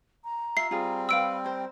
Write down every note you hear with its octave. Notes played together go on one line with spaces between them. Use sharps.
A#5
F4 E5 C7
G3 C4 F4 G#4
B4 F5 G5 E6 D7
A#4 C5